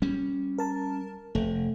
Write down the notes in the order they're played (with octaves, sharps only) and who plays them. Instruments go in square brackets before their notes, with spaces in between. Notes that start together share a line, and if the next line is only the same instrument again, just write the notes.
[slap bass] G3 C#4
[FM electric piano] A#4 A5
[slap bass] F1 [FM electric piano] A3